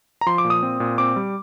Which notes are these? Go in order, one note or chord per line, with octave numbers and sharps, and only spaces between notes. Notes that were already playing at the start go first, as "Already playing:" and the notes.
A#5
F3 C6
D6
A#2
D#6
C4
A#2
C4 D6
G3